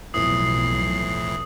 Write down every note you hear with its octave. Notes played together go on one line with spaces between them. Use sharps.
B1 F2 A2 E3 D#6 C7